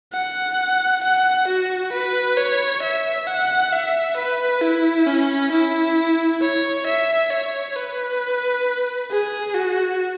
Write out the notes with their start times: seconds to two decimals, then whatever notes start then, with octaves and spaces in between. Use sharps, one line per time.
0.13 F#5
1.03 F#5
1.47 F#4
1.93 B4
2.37 C#5
2.82 E5
3.27 F#5
3.72 E5
4.17 B4
4.61 E4
5.07 C#4
5.52 E4
6.41 C#5
6.87 E5
7.31 C#5
7.76 B4
9.11 G#4
9.55 F#4